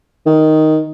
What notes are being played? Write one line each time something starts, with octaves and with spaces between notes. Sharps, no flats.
D#3